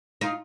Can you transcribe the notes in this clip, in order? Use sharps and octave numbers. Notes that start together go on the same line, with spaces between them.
D#4 F4